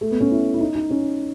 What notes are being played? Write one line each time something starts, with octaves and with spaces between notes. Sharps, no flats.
A3
B3
C#4
E4
E4
D#4
D#4
C#4